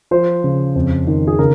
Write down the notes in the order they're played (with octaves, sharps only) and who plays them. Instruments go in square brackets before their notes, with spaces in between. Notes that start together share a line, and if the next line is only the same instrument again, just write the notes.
[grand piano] F3 C5
C#3
F2
D#3
G#4
C#3 A#4